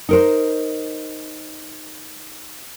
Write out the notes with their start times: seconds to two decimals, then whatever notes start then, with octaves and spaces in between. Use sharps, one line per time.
0.09 D#4 A#4 C5